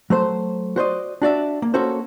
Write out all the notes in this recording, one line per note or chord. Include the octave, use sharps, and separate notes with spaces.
F#3 A3 C5
F#4 C5 D5 D#5
D4 F#4 D5 E5
A#3
A#3 C#4 F#4 A4 C5